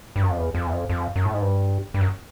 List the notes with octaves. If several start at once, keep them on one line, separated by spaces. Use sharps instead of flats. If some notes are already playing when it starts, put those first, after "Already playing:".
G2
F#2
F2
E2
F2
E2
F2
F2
F#2
A2
G#2
G2
G2
F#2